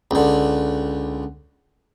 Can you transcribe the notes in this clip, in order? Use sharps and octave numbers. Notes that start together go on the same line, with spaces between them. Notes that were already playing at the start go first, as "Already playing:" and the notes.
C#2 D3